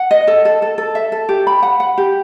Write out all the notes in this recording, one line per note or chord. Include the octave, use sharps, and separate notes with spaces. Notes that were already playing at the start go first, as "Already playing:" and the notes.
Already playing: F#5
D#5
A4
A4
A4
A4
E5
A4
G4
B5
F#5
F#5
G4